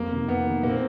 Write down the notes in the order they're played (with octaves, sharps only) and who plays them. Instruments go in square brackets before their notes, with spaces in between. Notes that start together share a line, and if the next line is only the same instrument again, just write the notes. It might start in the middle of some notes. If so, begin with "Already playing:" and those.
Already playing: [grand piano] F2 A#3
C3 D#3
F2 B3
C3 D#3
A#2 A#3
C4